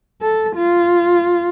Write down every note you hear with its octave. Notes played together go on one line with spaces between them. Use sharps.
A4
F4